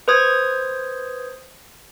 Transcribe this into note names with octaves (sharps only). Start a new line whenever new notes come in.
B4 C5 D#6 G#6